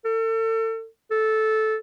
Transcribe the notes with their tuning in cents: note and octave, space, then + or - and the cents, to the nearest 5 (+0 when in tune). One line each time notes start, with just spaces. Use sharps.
A4 +35
A4 -10